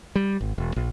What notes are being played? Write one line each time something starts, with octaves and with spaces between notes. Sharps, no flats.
G3
G#1
E1
A#1